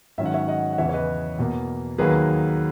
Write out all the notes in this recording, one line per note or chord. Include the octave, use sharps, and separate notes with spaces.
G#2 D#3 F#3 C#4 E5
F#5
C#5 E5
D#5 F#5
F#5
E2 C#3 E3 C#5 E5
C#5
B4 D#5
E2 B2 A#3
D#2 D#3 F#3 A#3 G#4 B4